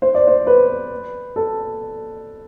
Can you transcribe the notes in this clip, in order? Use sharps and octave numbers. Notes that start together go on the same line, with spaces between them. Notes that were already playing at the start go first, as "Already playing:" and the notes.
C5
D5
C5
B4
A4